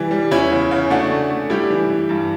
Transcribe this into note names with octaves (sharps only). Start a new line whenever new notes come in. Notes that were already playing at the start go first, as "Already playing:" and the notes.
Already playing: E3 G3
G3
E2 C#4 E4
C#3
C#3
A3 D4 F#4
A3
A3
G3 E4 G4
E3
E3
G2